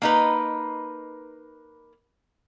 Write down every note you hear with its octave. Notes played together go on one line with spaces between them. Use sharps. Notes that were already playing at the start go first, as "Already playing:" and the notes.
A#3 D#4 B4